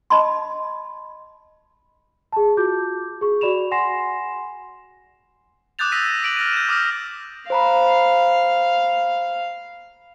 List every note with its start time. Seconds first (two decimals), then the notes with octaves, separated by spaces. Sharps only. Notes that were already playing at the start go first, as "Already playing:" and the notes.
0.10 D#5 A5 B5 C6
2.33 G#4 A5
2.57 F4 F#4 D6 G6
3.21 G#4 C#6
3.41 F#4 D5 B5 E7 F7
3.71 F#5 G#5 C6 A#6 C7 E7
5.79 D6 D#6 F#6 G6 A6 F7
5.92 D#6 E6 A#6 B6 D#7
6.23 B6 D7 F#7
6.37 F6 A#6 D#7
6.53 G6 E7
6.69 D6 D#6 F6 A#6
7.50 C5 F5 A#5 B5